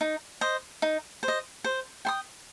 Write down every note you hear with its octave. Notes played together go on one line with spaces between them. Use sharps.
D#4
C5 D#5
D#4
C5
D#5
C5
G5 C6 D#6